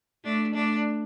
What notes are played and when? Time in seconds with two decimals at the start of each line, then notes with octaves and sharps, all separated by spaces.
0.25 A3 D4
0.54 A3 D4